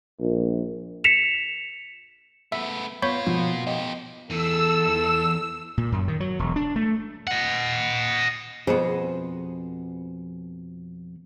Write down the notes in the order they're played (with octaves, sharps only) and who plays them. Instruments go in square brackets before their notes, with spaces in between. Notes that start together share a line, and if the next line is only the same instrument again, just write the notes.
[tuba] A#1
[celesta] B6 C#7 E7 F7
[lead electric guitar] A3 B3 [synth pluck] E5
[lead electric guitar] A#3 F4 [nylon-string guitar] B3 [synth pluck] C#5 B5 G6
[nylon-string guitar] B2 [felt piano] F3
[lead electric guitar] F4 G4 [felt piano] D#5
[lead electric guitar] E2 E3 [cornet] A4 [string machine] E6
[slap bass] A#2
F#2
D#3
F#3
E1
D4
A3
[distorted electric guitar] D#5 F#5
[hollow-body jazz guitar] F2 B2 B3 [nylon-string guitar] G#4 C5